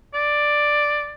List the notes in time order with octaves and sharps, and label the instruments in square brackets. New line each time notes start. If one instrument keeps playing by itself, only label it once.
[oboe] D5